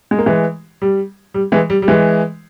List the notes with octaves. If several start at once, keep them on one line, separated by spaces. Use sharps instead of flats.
G#3
A#3
E3 G#3
G3
G3
E3 G#3
G3
G3
E3 G#3